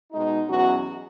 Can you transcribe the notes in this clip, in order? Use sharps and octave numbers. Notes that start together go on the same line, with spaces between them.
B2 G#3 D#4
E2 B2 F#3 C#4 F#4